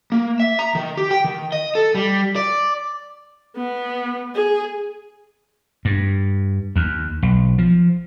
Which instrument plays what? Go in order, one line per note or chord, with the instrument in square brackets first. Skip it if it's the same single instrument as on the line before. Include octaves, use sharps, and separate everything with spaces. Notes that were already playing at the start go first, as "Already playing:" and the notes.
[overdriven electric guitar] A#3
E5
A#5
D#3
G4
G5
D#3
D#5
A4
G3
D5
[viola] B3
G#4
[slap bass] G2
D#2
B1
F3